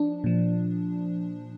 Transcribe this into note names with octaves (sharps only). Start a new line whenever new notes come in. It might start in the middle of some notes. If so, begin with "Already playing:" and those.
Already playing: F3 D4
A#2 F3